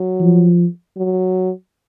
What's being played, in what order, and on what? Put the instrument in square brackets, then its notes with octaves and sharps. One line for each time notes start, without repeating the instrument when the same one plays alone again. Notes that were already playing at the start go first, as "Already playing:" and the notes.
Already playing: [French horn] F#3
[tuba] F3
[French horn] F#3